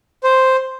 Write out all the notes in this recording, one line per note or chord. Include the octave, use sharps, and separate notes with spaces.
C5